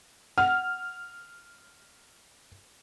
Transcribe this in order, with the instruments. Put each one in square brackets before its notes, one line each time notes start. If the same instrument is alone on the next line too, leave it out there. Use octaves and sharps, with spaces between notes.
[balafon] F#5 [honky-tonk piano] F6